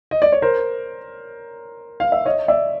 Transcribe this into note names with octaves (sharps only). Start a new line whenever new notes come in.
D#5
D5
C#5
A#4 C5
F5
E5
C#5 D#5
D5 E5